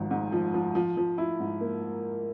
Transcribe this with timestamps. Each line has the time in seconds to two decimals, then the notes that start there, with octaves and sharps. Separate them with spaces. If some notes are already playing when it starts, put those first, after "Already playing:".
Already playing: G#1 G#2 F3
0.11 G#2
0.32 F3
0.54 F3
0.75 F3
0.97 F3
1.18 E4
1.40 G#2
1.61 A#3